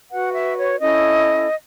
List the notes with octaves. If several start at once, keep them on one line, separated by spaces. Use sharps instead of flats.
F#4 B4 F#5
E5
C#5
C#4 E4 A4 D#5